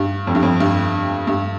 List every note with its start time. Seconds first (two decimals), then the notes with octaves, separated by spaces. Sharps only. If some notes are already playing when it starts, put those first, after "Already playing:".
Already playing: G2
0.27 F2
0.35 G2
0.43 F2
0.60 G2
1.27 G2